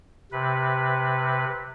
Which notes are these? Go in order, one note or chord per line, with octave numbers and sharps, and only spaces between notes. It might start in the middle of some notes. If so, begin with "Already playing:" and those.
C3 B4